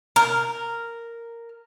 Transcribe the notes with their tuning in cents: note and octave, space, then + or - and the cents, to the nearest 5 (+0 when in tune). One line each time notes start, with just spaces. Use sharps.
A#4 -5